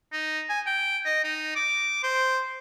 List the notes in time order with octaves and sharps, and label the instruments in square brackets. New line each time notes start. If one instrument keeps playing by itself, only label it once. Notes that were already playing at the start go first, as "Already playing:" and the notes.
[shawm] D#4
G#5
G5
D#5
D#4
D6
C5